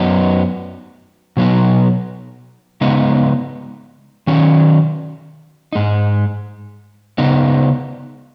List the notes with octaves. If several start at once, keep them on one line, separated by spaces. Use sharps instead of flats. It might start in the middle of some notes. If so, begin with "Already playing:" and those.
Already playing: F#2 F#3 B3 D#4
B2 F#3 B3 D#4
C#3 G#3 B3 D#4
D#3 F#3 C#4
G#2 G#3 D#4
C#3 B3 D#4